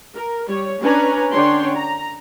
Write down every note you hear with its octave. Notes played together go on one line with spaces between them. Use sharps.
A#4
G3 C#5
C#4 D4 B4 C#5 G#5 A#5
D3 C#4 D4 C#5 G5 C6
A#5